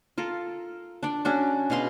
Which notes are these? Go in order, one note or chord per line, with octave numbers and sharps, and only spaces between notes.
F4 A4 A#4
D4 D5
C#4 D4 F#4
B2 G#4 F5 C6